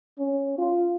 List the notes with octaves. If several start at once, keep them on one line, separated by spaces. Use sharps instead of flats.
C#4
F4